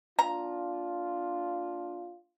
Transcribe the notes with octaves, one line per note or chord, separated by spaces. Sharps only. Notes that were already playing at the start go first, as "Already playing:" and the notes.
A#3 D4 F4 A#5